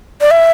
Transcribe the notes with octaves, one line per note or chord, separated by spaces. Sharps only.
D5
E5